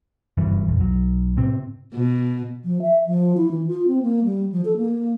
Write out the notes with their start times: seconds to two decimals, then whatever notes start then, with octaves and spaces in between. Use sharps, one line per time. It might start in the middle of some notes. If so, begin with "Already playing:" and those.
0.37 F#1 G2 E3
0.68 A#1 F2
0.80 B1 F#3
1.37 A2 C3 C4
1.94 B2
2.65 F3
2.82 E5
3.07 F3
3.37 E4
3.51 E3
3.67 F4
3.88 C4
4.02 A#3
4.24 G3
4.52 F3
4.65 A4
4.77 A#3